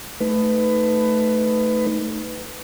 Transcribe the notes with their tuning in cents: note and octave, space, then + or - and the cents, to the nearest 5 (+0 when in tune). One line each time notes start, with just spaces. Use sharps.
A3 +0 D#4 +0 B4 +20